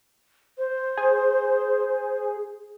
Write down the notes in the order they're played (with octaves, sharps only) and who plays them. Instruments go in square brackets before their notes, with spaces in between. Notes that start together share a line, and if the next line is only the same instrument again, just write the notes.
[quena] C5
[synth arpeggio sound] G#4